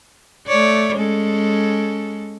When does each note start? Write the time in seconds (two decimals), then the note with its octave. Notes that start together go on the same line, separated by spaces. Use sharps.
0.47 A3 C#5 D5
0.95 G#3 C#4 A4